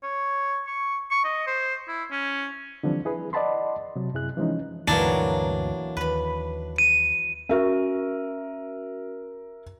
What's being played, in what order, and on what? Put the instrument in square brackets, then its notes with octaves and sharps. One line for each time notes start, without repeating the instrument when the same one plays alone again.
[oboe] C#5
C#6
C#6
D#5
C5
E4
C#4
[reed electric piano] D3 E3 F3 G3 C4 D4
E4 G#4 B4
D5 D#5 F#5 A5 B5 C6
C3 F#3
F#2 C3 E4 G#4 F#6
E3 F3 G#3 C#4 D#4
[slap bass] D2 G2 A#2 [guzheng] E3 F#3 A#3 [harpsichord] D4
[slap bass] D#2 [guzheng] B4 B5
[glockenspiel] D#7
[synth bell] C#4 F#4 [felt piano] A#4 E5